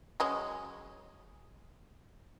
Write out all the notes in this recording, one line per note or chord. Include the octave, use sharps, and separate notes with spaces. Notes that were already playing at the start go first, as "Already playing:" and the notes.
F#3 G#3 C#4